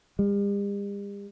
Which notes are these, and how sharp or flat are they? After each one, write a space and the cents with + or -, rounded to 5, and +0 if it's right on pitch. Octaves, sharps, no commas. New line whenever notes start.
G3 +45